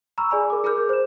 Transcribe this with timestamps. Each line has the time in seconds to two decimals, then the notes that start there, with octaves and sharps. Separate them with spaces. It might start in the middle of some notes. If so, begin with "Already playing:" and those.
0.18 A#5 B5 C#6 E6 F6
0.30 G#4 D5 G#5 B5 F6
0.50 A#4 D6
0.64 G#4 A#4 B5 D6 F6 G6
0.89 C5 E7